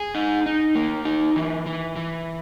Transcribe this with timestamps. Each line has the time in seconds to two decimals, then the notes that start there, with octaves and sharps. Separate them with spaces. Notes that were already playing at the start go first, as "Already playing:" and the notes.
Already playing: G#4
0.15 D#4
0.46 D#4
0.75 A#3
1.05 D#4
1.36 E3
1.66 E3
1.96 E3